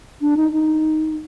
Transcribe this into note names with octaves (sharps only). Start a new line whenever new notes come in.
D4
D#4
D#4